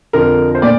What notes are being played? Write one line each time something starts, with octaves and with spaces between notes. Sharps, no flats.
F2 D3 F3 A#4
C5
A#2 D5